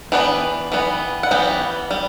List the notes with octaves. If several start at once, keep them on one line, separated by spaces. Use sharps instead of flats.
E3 B3 D4 G5
E3 G3 B3
F#5
E3 G3 B3 G5
G3